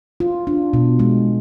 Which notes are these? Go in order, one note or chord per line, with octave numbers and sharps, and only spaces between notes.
F4
D4
B2
G#3